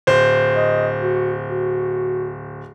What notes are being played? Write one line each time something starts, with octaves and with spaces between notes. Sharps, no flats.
D1 C5
D#5
F#4
F#4